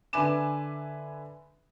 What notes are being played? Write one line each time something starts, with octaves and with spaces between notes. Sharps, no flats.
D3 B4 E5 G#5 D6 E7